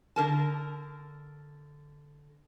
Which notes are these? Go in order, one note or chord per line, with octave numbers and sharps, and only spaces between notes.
D3 A#4 A5